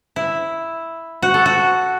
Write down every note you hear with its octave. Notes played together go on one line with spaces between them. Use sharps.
E4
F#4
A4
F#4